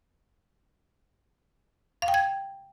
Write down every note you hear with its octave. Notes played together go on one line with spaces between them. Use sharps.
F5
G5
G#6